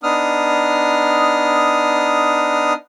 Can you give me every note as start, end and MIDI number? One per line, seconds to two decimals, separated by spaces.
0.03 2.73 59
0.03 2.73 62
0.03 2.73 63
0.03 2.73 87
0.03 2.73 89